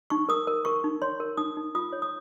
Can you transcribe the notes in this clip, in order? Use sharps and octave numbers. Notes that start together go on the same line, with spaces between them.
D#4 C#6
A#4 D#6
A#4
A#4 C#6
D#4
C#5 C6
A#4
D#4 D#6
D#4
F4 D#6
C#5
D#6